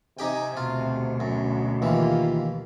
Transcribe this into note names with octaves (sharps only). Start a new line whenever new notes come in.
C3 D#4 G4 G5 G#5
D2 B2 F4
F#2
D#2 E3 A#3 F4